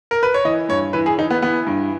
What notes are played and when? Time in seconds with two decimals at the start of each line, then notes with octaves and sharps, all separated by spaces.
0.11 A#4
0.23 B4
0.34 C#5
0.45 E3 D#5
0.69 G2 C#5
0.93 E3 B4
1.06 G#4
1.18 E3 D#4
1.31 B3
1.42 E3 B3
1.67 G2